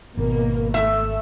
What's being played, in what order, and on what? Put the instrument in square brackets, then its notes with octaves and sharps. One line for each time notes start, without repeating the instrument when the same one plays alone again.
[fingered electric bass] G#1 [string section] B2 A#3
[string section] A3 [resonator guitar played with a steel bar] E5